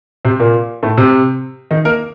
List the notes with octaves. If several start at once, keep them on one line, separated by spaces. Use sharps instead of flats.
C3 C4
A#2 A#3
A2 A3
C3 C4
D#3 D#4
A#3 A#4